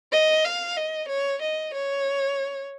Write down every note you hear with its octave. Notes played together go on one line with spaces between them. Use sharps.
D#5
F5
D#5
C#5
D#5
C#5